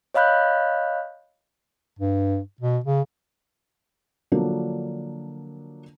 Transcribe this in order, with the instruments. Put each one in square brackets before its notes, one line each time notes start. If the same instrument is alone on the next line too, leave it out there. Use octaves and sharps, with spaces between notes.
[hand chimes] C#5 D#5 F5 B5 F#6 G6
[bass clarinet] G2
B2
C#3
[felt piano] D3 F3 F#3 A#3 D4 A#4